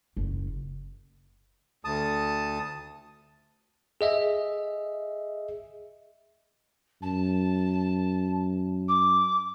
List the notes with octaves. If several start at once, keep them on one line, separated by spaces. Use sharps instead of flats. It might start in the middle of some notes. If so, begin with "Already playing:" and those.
F#1
D2 A5 D#6
G#4 D#5 E5
F#2 A5
D6